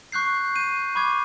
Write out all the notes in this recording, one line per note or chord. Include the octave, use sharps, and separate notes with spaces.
C#6 F#6 G6 C7
G6 D#7
B5 C#6 D6 G#6